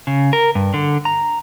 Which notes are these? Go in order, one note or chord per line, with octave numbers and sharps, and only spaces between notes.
C#3
A#4
G2
D3
A#5